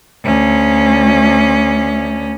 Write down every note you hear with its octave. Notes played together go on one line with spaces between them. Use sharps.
D2 C#4